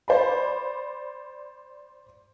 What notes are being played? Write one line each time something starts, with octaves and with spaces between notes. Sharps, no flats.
C5 D5 B5